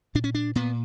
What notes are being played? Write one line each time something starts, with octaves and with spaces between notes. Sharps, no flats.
A#2 D4
C#4
D4
A#2 B3